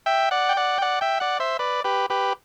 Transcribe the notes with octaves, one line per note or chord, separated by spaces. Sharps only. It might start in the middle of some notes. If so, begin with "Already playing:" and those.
E5 G5
D5 F#5
G5
D5 F#5
G5
D5 F#5
E5 G5
D5 F#5
C5 E5
B4 D5
G4 B4
G4 B4